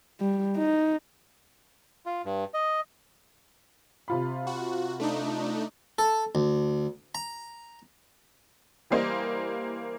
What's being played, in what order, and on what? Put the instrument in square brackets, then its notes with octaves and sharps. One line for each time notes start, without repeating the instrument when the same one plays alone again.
[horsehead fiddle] G3
D#4
[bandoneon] F4
G2
D#5
[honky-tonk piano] C3 F4 B5
[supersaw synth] F#4
A3 D4 D#4
[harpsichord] A4
D2
A#5
[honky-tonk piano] E3 G3 A#3 C5 D#5